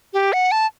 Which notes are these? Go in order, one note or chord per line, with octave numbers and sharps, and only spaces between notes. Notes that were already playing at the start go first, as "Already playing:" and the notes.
G4
F#5
A5